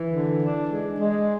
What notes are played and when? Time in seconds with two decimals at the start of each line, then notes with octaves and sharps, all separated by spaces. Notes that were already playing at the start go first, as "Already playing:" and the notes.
Already playing: E3
0.11 D3
0.40 D4
0.70 G#3
0.99 G#3